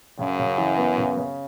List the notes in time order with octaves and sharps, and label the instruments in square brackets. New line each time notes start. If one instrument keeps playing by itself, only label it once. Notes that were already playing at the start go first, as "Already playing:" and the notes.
[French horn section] F#2 [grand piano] C#3
[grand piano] C#3
E3
B3
C#3
C#3